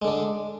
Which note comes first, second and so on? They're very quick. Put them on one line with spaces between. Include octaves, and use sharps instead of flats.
G#3 D3 D4